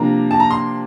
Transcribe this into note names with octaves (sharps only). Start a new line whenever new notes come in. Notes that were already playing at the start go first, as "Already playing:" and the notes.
Already playing: C3 F3 A#3 D4 A#5
A5
A#5
C6